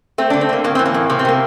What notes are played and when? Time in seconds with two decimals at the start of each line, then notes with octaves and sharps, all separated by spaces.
0.18 A3 C4
0.30 D3 D4
0.41 C4
0.49 D3 A#3
0.64 A2 A#3
0.75 E3 C4
0.85 A#3
0.94 A2
1.10 C3 A#3
1.19 C4
1.25 C3 A#3